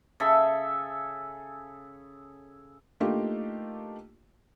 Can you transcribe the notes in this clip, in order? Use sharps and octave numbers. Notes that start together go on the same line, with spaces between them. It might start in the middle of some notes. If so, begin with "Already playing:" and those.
C#3 G#4 A4 E5
A3 A#3 D4 D#4 F4 G4